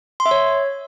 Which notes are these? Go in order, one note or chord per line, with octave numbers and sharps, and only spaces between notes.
C6
E5
C#5